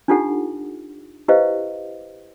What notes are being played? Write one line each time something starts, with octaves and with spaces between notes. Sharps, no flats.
D4 D#4 F4 G4 A4 F#5
E4 G4 B4 C5 D#5 F5